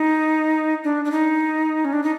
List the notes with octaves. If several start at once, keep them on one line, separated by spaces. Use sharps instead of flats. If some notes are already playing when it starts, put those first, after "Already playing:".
Already playing: D#4
D4
D4
D#4
C#4
D4
D#4